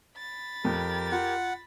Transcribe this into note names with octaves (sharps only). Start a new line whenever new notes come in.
B5 A6
F2 G4 A#4
F4 F#5